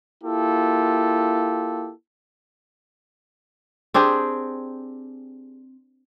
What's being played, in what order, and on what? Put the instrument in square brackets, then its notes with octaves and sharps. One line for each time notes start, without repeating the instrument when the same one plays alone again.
[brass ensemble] A#3 E4 F4 G4 A4
[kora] C4 D4 G4 G#4